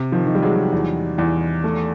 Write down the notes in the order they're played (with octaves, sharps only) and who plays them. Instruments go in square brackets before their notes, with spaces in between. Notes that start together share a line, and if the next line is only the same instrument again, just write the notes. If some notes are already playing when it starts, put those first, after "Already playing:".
Already playing: [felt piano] C3
[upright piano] D#3 F3
[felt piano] D#3
[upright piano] G3
F#3 G#3
[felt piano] E2
E2
A3